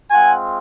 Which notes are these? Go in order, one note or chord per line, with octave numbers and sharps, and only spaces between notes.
G#3 C4 F4 F#5 G#5